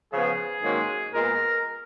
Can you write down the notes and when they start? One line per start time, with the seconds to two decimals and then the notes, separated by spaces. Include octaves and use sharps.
0.12 C#3 F3 B3 G#4
0.63 G#2 D#3 F#3 A#3 C#4
1.13 A#2 G#3 B3 A#4